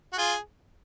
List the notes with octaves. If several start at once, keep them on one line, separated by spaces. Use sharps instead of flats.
F#4
F4 G#4